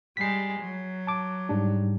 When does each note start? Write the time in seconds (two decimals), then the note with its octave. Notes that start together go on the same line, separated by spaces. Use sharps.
0.17 G3 G#3 B6 C7
0.60 F#3
1.07 A5 D6
1.49 G#2 G3 D4